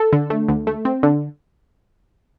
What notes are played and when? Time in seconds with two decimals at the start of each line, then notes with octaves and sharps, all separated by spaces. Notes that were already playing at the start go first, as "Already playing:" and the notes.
Already playing: A4
0.13 D3
0.30 A3
0.49 D2
0.67 A3
0.85 C4
1.03 D3